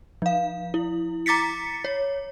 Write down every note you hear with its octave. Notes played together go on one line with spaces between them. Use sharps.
F3 F5
E4
A#5 D6 A6 B6 C#7
C#5